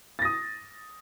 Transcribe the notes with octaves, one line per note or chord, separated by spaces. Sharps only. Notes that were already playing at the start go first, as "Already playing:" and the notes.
D#6 A6 A#6